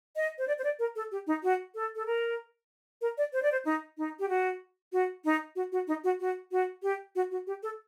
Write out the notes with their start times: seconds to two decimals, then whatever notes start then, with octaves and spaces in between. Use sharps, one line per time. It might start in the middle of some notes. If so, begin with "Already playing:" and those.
0.16 D#5
0.38 C5
0.47 D5
0.59 C5
0.64 D5
0.79 A#4
0.96 A4
1.11 G4
1.27 D#4
1.43 F#4
1.75 A4
1.95 A4
2.06 A#4
3.01 A#4
3.17 D5
3.33 C5
3.42 D5
3.52 C5
3.65 D#4
3.97 D#4
4.19 G4
4.29 F#4
4.92 F#4
5.24 D#4
5.55 F#4
5.72 F#4
5.87 D#4
6.04 F#4
6.20 F#4
6.51 F#4
6.82 G4
7.15 F#4
7.31 F#4
7.47 G4
7.63 A4